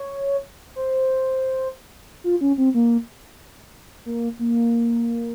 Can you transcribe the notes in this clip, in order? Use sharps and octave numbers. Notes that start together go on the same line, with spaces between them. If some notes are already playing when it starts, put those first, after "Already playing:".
Already playing: C#5
C5
F4
C#4
C4
A#3
A#3
A#3